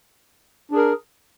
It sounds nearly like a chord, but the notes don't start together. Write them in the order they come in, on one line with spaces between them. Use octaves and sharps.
D4 G#4 A#4